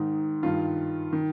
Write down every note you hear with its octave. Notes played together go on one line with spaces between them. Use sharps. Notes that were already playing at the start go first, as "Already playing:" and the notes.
Already playing: G#2 D#3 D#4
G2 D#3 F4
D#3